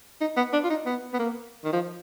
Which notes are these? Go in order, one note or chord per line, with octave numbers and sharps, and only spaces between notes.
D#4
B3
D4
F4
D#4
B3
B3
A#3
D#3
F3